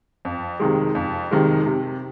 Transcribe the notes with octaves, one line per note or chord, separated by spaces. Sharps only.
F2
C3 D#3 G#3
F2
C3 D#3 G#3
C3